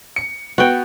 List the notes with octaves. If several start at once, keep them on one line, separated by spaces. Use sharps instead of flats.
C#7
B3 F#4 G5